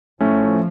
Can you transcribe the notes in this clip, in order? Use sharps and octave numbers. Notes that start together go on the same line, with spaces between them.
A2 F3 A3 C#4